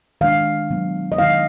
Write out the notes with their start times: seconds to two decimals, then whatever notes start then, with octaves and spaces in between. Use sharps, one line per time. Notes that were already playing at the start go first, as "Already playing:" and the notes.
0.21 D#3 G#3 D4 F5
0.70 B2 F#3 B3
1.12 D#5
1.18 D#3 G#3 D#4 F5